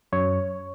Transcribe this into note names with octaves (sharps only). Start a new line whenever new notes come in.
F#2 C#5